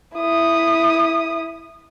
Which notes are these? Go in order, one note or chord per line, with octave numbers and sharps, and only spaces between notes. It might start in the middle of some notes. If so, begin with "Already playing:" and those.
E4 D#6